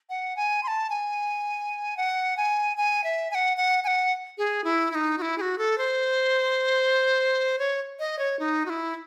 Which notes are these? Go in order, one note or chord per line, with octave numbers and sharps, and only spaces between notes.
F#5
G#5
C6
A5
G#5
F#5
G#5
G#5
E5
G#5
F#5
F#5
G#5
F#5
G#4
E4
E4
D#4
F#4
E4
G#4
F#4
A4
C5
C#5
D#5
C#5
D#4
F#4
E4